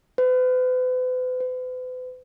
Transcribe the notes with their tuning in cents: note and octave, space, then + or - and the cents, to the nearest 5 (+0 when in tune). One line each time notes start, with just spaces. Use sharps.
B4 +40
B4 +40